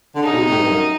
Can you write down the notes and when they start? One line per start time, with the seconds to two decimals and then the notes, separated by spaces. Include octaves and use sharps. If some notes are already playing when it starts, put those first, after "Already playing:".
0.15 D3
0.23 C#3 D#4
0.32 B2
0.40 C3
0.49 A2
0.57 G2
0.69 F#2